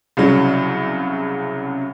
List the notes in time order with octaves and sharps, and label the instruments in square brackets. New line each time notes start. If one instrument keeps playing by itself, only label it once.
[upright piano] C2 C#3 F#3